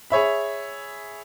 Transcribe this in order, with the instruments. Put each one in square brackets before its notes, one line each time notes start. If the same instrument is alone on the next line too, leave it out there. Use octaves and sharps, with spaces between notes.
[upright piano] G#4 C#5 E5 B5